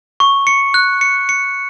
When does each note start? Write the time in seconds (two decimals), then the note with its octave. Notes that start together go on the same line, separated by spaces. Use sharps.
0.20 C#6
0.47 C#7
0.74 F#6
1.01 C#7
1.29 C#7